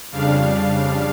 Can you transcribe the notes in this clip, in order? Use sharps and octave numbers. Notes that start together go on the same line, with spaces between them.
F2 C#3 G3 D4 F5